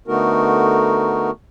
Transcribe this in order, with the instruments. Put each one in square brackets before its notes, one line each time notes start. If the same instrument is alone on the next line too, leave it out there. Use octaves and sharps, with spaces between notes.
[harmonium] D3 A3 B3 D#4 F#4 A#4